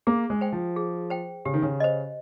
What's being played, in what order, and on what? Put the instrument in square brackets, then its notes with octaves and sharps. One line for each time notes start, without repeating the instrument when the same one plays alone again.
[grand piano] A#3 [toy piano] G#4
[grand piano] G#3
[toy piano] C5 G5
[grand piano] F3
[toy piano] G#4
C5 G5
[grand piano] C#3 [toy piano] G4
[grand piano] D#3
C#3
[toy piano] C5 D#5